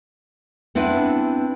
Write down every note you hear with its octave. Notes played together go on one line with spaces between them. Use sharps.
B3 C4 D4 E4 B4